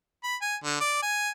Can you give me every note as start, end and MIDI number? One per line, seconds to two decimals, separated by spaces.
0.24 0.36 83
0.42 0.56 80
0.64 0.77 50
0.81 0.99 74
1.02 1.30 80